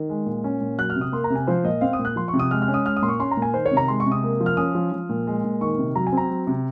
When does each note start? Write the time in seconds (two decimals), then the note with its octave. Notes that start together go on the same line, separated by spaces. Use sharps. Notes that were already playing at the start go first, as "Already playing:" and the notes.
Already playing: D#3
0.09 G#3
0.26 A#2
0.44 C#4
0.61 A#2
0.78 F#3 F#6
0.90 F6
0.96 C3
1.01 D#6
1.12 A#3 C6
1.24 A#5
1.30 C3
1.36 G#5
1.47 F3 C5
1.64 A#2 D#5
1.81 C4 F5
1.93 D#6
1.99 A#2
2.05 F#6
2.16 F3 C6
2.28 C#6
2.33 C3
2.39 D#6
2.51 G#3 F6
2.62 F6
2.68 C#4
2.74 D#6
2.85 G#3 F6
2.97 D#6
3.02 A#2 C6
3.08 C#6
3.20 C#4 C6
3.31 A#5
3.37 A#2
3.42 G#5
3.54 D#3 C5
3.66 C#5
3.71 C3
3.77 A#5
3.88 G#3 C6
4.00 C#6
4.06 C3
4.12 D#6
4.23 A#3
4.40 F3
4.46 F6
4.57 C#4 D#6
4.75 F3
4.92 F3
5.09 A#2
5.27 G#3
5.44 A#2
5.61 D#3 C#6
5.78 C3
5.96 F#3 A#5
6.07 G#5
6.12 C4
6.17 A#5
6.30 F#3
6.47 C3